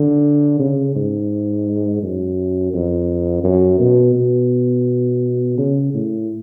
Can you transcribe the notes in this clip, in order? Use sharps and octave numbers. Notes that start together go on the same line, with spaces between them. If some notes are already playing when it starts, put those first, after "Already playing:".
Already playing: D3
C#3
G#2
F#2
F2
F#2
B2
B2
C#3
A2